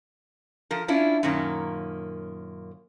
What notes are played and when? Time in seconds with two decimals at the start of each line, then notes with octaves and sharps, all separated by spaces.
0.71 F3 A#4
0.88 C#4 D4 E4 F4
1.23 F#2 A#2 D#3 A#3 C#4